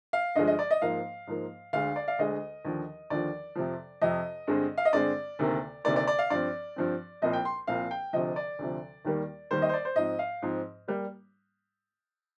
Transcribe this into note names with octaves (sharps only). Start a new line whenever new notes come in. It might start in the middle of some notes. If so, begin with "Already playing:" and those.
F5
G2 D3 F3 G#3 D#5
D#5
D5
D#5
G#2 F3 A#3 F5
G#2 F3 A#3
D2 D3 G#3 F5
D5
F5
D2 D3 G#3 D#5
D#2 D3 F3
D#2 D3 F3 D5
F2 C3 F3
F2 C3 F3 D#5
G2 D3 G#3 C4
F5
D#5
G2 D3 G#3 C4 D5
D2 C3 D#3 A#3
D2 C3 D#3 A#3 D5
D5
D5
F5
G2 F3 C4 D5
G2 F3 C4
C2 A#2 F3 C4 D#5
G5
C6
C2 A#2 F3 C4 F5
G5
D2 C3 F3 D#5
D5
D2 C3 F3
D#2 D#3 G3 A#3
D#2 D#3 G3 A#3 C5
D#5
C5
D5
C5
G#2 F3 C4 D#5
F5
G#2 F3 C4
G3 A#3